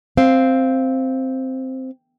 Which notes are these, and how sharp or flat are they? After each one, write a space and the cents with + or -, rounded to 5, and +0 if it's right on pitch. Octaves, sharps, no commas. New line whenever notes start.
C4 +0 F5 -10